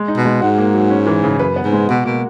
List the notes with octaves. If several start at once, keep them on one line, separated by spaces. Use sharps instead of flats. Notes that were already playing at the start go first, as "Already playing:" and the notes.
Already playing: G#3
D#4
B2
G#3
G#2 F#4
A#3
F#3
C#4
E3
C#3
F#2 B4
B3
G#2
G#3
B2 F#4
B2 A#3